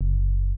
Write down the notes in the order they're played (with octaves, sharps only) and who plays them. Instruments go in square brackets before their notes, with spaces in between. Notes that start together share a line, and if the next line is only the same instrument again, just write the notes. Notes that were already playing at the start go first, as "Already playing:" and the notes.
[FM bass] F#1